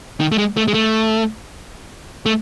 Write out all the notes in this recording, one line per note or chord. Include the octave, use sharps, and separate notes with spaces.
D#3
A3
G#3
A3
G#3
A3
A3